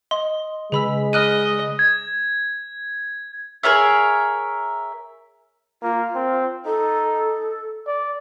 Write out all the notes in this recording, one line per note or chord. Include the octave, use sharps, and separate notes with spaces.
D#5 C6
C#3 G#3 G#4 B4 B5 E6 B6
D#5 F6 F#6 D#7
G#6
G#4 A#4 C#5 E5
A#3 F4
C4
D#4 A4
D5